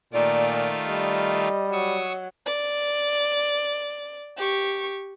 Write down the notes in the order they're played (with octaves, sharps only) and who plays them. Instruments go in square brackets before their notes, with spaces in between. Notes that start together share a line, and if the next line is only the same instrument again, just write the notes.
[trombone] A#2 [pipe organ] D#3 A3 F4 [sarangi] D5
[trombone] G3 [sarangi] D#5
[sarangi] F#3 [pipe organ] C#6 D#6 E6
[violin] D5
G4 C#6